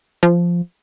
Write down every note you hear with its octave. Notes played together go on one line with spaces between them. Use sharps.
F3